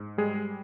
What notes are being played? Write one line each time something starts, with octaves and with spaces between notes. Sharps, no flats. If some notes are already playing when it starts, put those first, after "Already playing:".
Already playing: G#2
G3 G#3 G#4